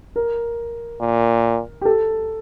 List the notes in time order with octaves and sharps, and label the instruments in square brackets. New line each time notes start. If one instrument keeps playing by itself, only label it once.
[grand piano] A#4
[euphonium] A#2
[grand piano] G4
A4